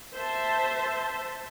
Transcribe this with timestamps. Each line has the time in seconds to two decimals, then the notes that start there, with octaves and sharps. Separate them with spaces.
0.14 C5 E5 A5